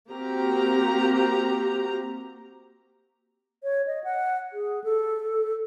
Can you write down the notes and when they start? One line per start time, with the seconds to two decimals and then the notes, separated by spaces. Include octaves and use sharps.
0.12 A#3 C4 F#4 G4 A#5
3.63 C#5
3.87 D#5
4.04 F#5
4.53 G#4
4.84 A4